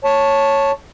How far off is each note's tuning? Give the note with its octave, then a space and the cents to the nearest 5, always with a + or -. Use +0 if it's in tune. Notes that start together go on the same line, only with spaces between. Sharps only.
C#5 +0 A5 +0